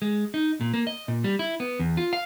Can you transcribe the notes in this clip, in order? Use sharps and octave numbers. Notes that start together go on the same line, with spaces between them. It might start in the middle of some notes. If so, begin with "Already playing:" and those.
G#3
D#4
A#2
A#3
D#5
A#2
G3
E4
B3
E2
F4
F5